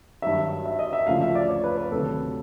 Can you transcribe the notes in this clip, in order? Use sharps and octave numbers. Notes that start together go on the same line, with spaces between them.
G2 D#3 F#3 E5
E5
D#5
E5
D2 C#3 F3 F5
E5
D5
C#5
B4
B4
D2 C3 D#3 F#3 A4